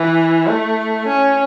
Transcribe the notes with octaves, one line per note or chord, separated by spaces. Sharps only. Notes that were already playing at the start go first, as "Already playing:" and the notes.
Already playing: E3
A3
C#4